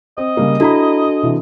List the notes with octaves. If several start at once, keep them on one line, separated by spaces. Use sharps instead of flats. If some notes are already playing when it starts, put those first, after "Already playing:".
C4 D#5
C#3 G3 A#3
D4 E4 F#4 A4 A#5 B5
C3 E3